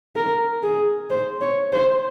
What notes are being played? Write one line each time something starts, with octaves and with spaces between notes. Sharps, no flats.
A#4
G#4
C5
C#5
C5